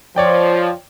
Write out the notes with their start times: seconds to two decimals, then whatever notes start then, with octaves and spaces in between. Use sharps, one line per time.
0.16 F3 C#5 D5 G5